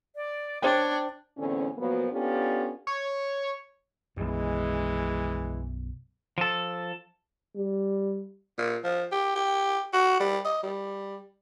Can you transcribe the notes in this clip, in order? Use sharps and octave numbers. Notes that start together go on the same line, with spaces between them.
D5
D4 C5 C#5 G5
E2 A2 D3 C4 C#4
A#2 F3 F#3 A#3 B3
B3 C#4 D4 F4 G4 A4
C#5
B1 F#2 E3 G#3
F3 A4
G3
A#2
F3
G4
G4
F#4
G3
D#5
G3